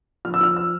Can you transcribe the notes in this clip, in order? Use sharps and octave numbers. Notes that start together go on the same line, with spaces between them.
F3 F6
E6
F3 F6
E6